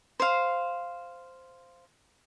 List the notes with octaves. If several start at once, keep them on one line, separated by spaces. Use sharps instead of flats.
C5 F5